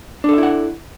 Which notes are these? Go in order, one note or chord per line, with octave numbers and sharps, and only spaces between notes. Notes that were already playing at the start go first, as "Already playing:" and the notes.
D4 E4 A4 E5 F#5